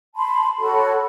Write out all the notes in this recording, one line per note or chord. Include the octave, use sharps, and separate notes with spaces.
A5 B5 C6
F#4 A4 C#5 B5